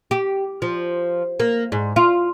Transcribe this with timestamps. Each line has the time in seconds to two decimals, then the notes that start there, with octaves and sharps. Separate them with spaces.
0.11 G4
0.62 F3
1.40 A#3
1.72 G#2
1.96 F4